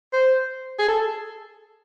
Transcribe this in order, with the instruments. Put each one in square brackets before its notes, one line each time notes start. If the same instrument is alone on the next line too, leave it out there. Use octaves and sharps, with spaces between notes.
[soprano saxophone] C5
G#4
A4